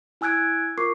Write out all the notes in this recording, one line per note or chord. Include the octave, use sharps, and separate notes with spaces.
E4 G#5 E6 F#6 G#6 D7
F4 A#4 C#6 D6 C7